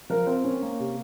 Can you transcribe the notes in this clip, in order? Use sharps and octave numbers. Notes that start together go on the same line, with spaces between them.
F3 A#4
C4 A#4
C#4
A#3
C3